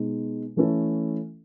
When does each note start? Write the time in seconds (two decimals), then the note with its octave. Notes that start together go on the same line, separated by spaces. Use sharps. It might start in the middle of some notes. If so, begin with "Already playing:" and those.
Already playing: B2 G#3 D#4
0.56 E3 A3 C#4 E4 A4